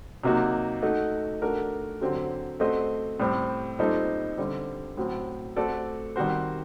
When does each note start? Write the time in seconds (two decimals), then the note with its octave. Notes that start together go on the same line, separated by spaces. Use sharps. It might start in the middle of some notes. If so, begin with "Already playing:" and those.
0.24 C3 F#3 A#3 D#4 F#4
0.82 A3 D#4 F#4
1.42 A3 D4 F#4 A#4
2.01 D3 F#3 C4 G4
2.60 A3 C4 F#4 C5 D#5
3.20 A2 G3 C4
3.79 A#2 G3 C4 D#4 A4
4.38 D3 G3 C4
4.97 A2 F#3 C4
5.56 A3 C4 F#4 A4 D5
6.16 D#3 G3 C4 F#4 C5